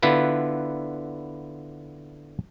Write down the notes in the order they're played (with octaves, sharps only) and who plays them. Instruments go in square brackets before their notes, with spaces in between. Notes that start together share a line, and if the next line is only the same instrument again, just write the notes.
[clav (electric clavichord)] D3 B3 E4 F4 B4